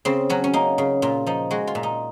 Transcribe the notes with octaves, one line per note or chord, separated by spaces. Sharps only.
C#3 C4
F#3 C#4
C#4
A#3 D#4
C#3
A#2 F4
F3 D#4
G#3 F#4
F4
A#2
D#4